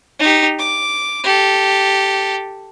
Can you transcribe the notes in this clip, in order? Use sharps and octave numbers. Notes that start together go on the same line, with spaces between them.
D#4 G4
D6
G4 A4